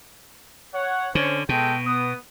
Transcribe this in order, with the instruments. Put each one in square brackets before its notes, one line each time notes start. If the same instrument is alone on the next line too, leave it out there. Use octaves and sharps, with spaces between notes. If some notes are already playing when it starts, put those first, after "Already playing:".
[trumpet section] C#5 F#5
[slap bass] D3 [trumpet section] C#4 C5 C#5
[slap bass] B2 [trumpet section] G#3 A4 G5
[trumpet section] B3 D#6